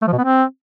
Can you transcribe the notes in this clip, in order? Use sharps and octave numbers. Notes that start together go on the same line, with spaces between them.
A3
F3
B2
B3
C4